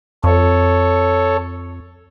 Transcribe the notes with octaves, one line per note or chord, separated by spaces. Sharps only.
F2 A4 C#5